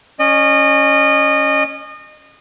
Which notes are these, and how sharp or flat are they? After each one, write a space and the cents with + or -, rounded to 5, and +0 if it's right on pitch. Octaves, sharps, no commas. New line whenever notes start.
C#4 +0 D#5 -30